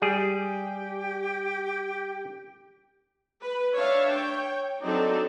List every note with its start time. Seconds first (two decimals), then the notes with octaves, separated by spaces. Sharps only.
0.02 G3 G4 G#4
3.42 B4
3.76 D4 C#5 E5 F5
4.12 C#5 G5
4.83 F#3 C4 D4 D#4 A4 D5